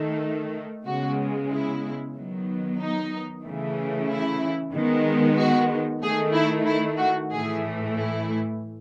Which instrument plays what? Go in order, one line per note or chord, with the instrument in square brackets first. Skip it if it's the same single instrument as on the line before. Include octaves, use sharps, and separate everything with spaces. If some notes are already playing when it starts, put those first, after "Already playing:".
Already playing: [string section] D#3 A3
C#3 G#3 B3 F#4
E4
D#3 F#3 B3
D#4
C#3 E3 A3
E4
D#3 G#3 B3
F#4
D#3 A3 G#4
E4
E4
F#4
A2 E3 A3 G#4
E4